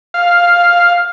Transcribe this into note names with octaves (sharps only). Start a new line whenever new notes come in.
F5